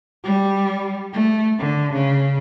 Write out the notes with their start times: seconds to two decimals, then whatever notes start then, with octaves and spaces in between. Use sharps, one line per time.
0.24 G3
1.13 A3
1.59 D3
1.93 C#3